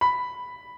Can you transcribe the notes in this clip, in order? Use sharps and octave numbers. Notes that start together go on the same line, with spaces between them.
B5